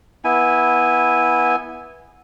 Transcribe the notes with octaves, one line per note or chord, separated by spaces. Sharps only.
B3 E4 G#5